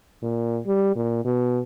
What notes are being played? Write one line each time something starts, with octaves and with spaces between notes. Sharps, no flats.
A#2
G3
A#2
B2